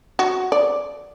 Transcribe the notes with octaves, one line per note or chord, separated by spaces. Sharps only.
F#4
D5